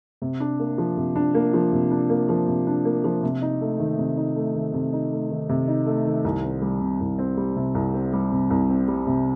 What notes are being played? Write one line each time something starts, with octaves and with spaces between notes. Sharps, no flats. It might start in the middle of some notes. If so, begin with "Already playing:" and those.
C3
D4
A#3
F3
C3
D4
A#3
F3
C3
D4
A#3
F3
C3
D4
A#3
F3
C3
D#4
A3
D#3
C3
D#4
A3
D#3
C3
D#4
A3
D#3
C3
D#4
A3
D#3
C2
C4
G3
C3
C2
C4
G3
C3
C2
C4
G3
C3
C2
C4
G3
C3